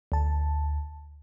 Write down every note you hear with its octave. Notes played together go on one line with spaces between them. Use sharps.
D2 A5